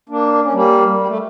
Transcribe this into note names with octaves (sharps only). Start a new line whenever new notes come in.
A#3 D4
C#4
G3 A#3
G3
A3